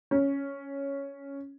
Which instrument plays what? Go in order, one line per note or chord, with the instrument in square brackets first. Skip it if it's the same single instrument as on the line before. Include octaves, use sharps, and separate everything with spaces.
[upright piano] C#4